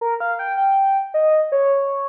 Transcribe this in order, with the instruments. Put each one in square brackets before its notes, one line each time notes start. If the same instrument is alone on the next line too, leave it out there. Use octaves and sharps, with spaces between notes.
[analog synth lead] A#4
F5
G5
G5
D#5
C#5